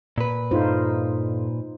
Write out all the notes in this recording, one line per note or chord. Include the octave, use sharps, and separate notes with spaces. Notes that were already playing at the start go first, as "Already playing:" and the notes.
A#2 B4
G2 D#4 F4 A4 C5